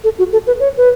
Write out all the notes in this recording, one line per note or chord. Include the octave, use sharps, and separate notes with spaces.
A4
F#4
A4
B4
C#5
B4